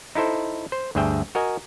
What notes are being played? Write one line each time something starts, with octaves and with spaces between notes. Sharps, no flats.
D#4 E4 A4 C5
C5
D2 G2 G#4 E5 G5
F#4 A#4 D#5 G#5